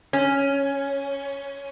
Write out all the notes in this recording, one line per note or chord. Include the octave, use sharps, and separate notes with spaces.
C#4